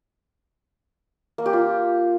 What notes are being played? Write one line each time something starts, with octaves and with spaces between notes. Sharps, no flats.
A#3
G4
F4